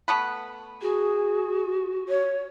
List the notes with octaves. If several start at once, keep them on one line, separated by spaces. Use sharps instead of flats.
A3 B3 B4
F#4 G#4
C#5